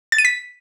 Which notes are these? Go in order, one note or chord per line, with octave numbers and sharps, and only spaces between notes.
A6
D#7
B6